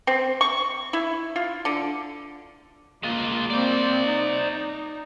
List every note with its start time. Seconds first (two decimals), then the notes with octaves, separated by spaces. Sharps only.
0.07 C4
0.41 C#6
0.93 E4
1.36 F4
1.65 D3
3.03 G#3 A#3 F4
3.50 A#3 C4 C5 D5
4.06 D#4